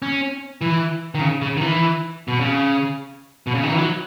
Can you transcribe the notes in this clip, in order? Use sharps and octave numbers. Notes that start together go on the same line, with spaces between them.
C#4
E3
D#3
C#3
C#3
D#3
E3
B2
C#3
B2
C#3
D#3
E3
F#3